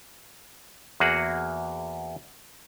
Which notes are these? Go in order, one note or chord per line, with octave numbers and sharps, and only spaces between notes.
E2 A#3 F#4 G#4 F#5